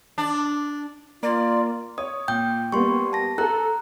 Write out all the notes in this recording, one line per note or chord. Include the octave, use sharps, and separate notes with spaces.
D4
A#3 F4 D5
C#5 D#6
A#2 G5 G6
G3 A#3 B3 C6 C#6
A5 A#6
A4 A#5 F#6